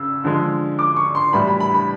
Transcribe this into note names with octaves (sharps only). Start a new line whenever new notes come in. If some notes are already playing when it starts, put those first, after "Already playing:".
Already playing: C#3 E6
D3 F3 G#3
D6
C#6
C6
A2 E3 G3 B5
B5
B5
B5